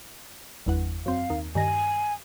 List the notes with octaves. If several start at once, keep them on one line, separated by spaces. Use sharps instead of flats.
G1 E2 F#5
F#2 C4 F5
D#2
G2 D#3 G#5 A#6